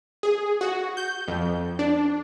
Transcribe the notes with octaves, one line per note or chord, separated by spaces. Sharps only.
G#4
F#4
G6
F2
D4